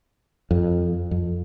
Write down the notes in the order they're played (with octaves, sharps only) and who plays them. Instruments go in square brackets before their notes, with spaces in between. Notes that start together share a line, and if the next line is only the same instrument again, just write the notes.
[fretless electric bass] F2
F2